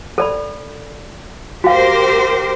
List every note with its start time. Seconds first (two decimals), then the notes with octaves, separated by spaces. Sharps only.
0.18 A4 D5 B5
1.64 F#4 G4 A#4 C5 F5